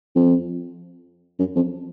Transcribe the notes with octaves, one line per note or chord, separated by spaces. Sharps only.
F2
F#2
F2